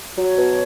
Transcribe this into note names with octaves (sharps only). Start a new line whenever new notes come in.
F#3 C#5
B2